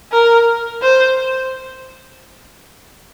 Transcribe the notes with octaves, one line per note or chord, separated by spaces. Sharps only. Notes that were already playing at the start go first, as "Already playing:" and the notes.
A#4
C5